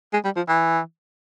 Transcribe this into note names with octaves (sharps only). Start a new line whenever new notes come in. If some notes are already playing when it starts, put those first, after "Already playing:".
G#3
G3
F3
E3